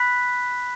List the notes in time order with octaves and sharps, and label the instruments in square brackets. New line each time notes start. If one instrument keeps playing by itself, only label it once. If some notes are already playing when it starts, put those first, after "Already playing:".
Already playing: [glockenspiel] B5 F#6 B6